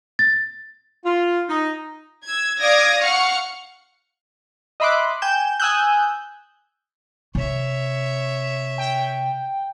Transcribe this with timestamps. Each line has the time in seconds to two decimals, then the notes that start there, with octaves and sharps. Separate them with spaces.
0.19 A6
1.05 F4
1.49 D#4
2.24 E6 G#6
2.60 D5 F5 D#6 G#6 A#6 D7
3.02 F5 F#5 C#6 F6 C#7
4.80 D#5 E5 B5 C6 D6 F#6
5.22 G5 G#5 G6 E7
5.60 G#5 D#6 E6 F#6 G6
7.35 C3 C#5 E5
8.78 G5